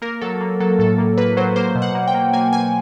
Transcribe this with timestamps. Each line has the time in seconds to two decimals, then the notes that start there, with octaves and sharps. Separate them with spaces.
0.02 A#3 A#4
0.21 F#3 A4
0.41 A#3
0.60 F#3 A4
0.79 A2 A4
0.98 A#3
1.18 A#3 B4
1.37 F#3 C5
1.56 A#3 C5
1.75 B2
1.82 F#5
1.95 A#3
2.08 G5
2.14 A#3
2.33 A#3 G#5
2.53 A#3 G#5